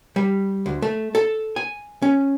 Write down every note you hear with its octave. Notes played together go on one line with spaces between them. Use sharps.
G3
D2
A3
A4
G#5
C#4